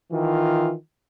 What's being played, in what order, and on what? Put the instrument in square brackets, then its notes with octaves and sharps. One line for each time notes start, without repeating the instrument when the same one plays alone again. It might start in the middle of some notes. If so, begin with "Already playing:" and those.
[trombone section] D#3 E3 F4